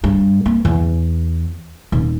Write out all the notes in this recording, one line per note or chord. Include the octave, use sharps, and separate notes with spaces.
G2
A#3
E2
D#1